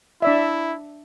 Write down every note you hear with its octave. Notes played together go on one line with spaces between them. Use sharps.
D4 E4 D5 E5